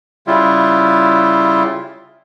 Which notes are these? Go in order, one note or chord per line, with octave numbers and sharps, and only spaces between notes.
C#3 G3 E4 F4